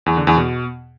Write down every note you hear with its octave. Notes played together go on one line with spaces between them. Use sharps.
E2
D3
E2
B2